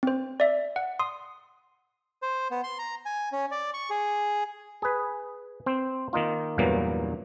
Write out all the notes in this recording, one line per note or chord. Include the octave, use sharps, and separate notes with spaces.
C4 C5
D5 E5
F#5
C6 D#6
C5
B3
C6
A#5
G#5
C#4
D5
C#6
G#4
G#4 B4
C4 C5
D#3 A#3 D#4 F4
E2 G2 A#2 E3 F#3 A#3